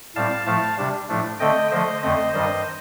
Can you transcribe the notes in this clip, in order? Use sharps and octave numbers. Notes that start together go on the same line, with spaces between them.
A2 G3 C4 F5 A5
A2 F3 A3 F5 A5
C3 G3 D4
A2 F3 A3 D4
D3 A3 C4 D#5 G5
D3 F3 A3 C5 D#5
F2 D3 A3 C4 C5 D#5
G2 D#3 G3 C5 D#5